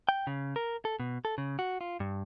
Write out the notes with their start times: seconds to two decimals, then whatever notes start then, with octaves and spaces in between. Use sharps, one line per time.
0.09 G5
0.27 C#3
0.56 A#4
0.85 A4
1.00 B2
1.25 A4
1.38 C#3
1.59 F#4
1.81 F4
2.00 G2